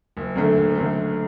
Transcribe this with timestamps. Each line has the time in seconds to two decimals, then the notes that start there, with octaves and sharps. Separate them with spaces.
0.17 F#1
0.36 F#2 D3 A3
0.56 F#1
0.75 F#2 D3 A3
0.95 F#1